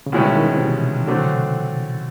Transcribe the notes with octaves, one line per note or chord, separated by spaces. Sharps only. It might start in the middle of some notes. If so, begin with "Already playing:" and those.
C#3
C2 B2 D3 G#3 C#4 E4
D#3
D#3
E3
C3
B2
D3 F#3 A3 C4